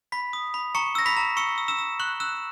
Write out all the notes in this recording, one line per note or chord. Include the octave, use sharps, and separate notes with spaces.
B5 B6
D#6
B5
A#5 C#6 C#7
E6 A#6
B5 B6
A#5
C#6 E6 C#7
E6
E6 E7
E6
C#6 F#6 F#7
E6 F#6 E7